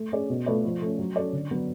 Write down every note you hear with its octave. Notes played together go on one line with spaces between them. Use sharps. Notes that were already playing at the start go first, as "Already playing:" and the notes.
Already playing: A3
C#4 G#4 D5
B2
A3 F4 B4 D5
F3
A3 C#4
F#3
C#4 F#4 A4 D5
D3
F#3 B3